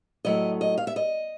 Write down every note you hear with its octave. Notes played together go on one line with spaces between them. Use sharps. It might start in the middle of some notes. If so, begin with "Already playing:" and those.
A2 F#3 A3 D#5
D#5
F5
E5
D#5